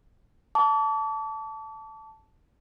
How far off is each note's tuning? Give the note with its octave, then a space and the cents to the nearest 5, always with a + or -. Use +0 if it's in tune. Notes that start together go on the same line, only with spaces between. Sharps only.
A5 +0 D6 -40